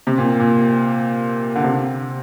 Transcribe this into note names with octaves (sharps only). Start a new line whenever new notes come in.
C3
A#2
A#2
D3
C3